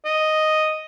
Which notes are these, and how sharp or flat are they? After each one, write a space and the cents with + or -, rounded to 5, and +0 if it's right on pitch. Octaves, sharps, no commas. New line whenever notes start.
D#5 +0